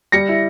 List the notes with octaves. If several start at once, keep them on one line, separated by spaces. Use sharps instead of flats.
G3 A#6 C#7
E4